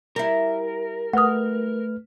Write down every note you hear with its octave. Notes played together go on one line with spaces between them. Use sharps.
G3 E4 A#4
A3 B4 F#5 D#6 F6